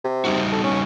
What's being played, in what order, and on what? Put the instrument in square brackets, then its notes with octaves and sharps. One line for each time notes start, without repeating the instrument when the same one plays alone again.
[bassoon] C3
[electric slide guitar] G3 D#4 F#4
[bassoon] A4
C#4